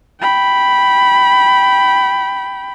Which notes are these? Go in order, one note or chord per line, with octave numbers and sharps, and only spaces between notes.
G5 B5